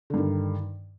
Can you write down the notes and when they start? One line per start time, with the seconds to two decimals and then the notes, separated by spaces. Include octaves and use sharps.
0.10 D3
0.14 G2
0.17 D#3